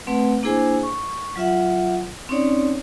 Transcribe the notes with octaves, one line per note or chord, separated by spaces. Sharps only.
A3 C4 B4 F#5
A#3 D4 E4 G#4 C5 G#5
C#6
F#3 F4 E5 F#5
C4 C#4 D#4 C#5 D5